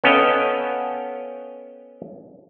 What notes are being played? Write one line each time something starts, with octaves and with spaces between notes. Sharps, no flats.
B3 C#4 A4 D#5 F5 G5